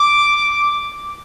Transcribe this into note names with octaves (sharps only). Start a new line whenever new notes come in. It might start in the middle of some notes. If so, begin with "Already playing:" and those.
Already playing: D6